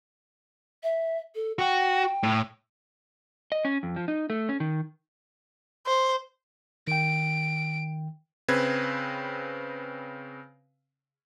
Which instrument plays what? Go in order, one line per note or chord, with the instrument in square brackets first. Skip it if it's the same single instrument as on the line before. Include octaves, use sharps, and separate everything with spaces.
[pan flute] E5
A4
[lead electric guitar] F#4 [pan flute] G5
[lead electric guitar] A2
[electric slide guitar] D#5
C#4
F2
F3
D#4
A3
C#4
D#3
[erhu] C5
[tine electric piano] D#3 G5 [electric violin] D7
[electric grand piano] C#3 C4 B4 G#6